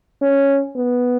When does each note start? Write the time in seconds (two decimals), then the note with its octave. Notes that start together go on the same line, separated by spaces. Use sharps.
0.22 C#4
0.76 B3